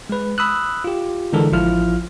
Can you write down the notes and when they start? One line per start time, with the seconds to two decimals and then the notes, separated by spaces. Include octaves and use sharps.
0.09 G#3 B4
0.38 B5 D#6 E6 F#6
0.84 F4 G4
1.33 D3 E3 G#3 D4 A4 A#4
1.52 A1 F3 E4 F4 F6